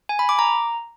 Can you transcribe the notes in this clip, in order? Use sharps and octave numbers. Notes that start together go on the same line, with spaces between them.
G#5
B5
D6
A#5